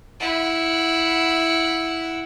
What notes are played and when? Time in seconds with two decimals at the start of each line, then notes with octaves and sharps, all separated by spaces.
0.20 E4 F#5